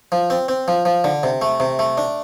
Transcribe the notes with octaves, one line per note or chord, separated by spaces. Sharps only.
F3
C4
C4
F3
F3
D3
C3
A3
C3
A3
D4